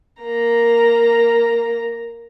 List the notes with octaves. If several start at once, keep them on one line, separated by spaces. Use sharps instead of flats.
A#3 A#5